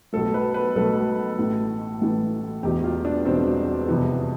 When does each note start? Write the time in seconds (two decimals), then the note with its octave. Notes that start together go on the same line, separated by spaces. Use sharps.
0.13 B1 B2 A3 A4
0.34 B4
0.54 B4
0.75 B1 B2 A3 A4
1.38 A1 A2 E3
2.01 A1 A2 E3
2.63 E1 E2 B2 G4
2.84 F4
3.05 D4
3.25 E1 E2 B2 C4
3.88 F2 C3 E3 B3